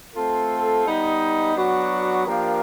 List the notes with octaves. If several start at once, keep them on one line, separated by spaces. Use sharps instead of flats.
A3 C4 F4 A4
G3 B3 D#4
F#3 B3 D4 F#4
F3 A#3 D4 G4 A#4